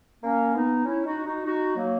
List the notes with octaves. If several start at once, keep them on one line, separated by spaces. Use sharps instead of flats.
A#3 C#4
B3 D#4
C#4 E4
D#4 F#4
D#4 F#4
D#4 F#4
F#3 A#3